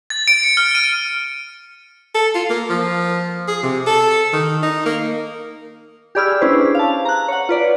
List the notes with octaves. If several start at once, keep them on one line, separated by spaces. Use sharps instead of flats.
A6
D7
C#7
F6
D#7
A4
F4
A#3
F3
G#4
C3
A4
D#3
D#4
A#3
G4 G#4 D5 B5 E6 F6
C#4 D4 E4 G#4 B4 C5
F5 A5
A#5 F#6
C#5 F#5
F4 B4 D5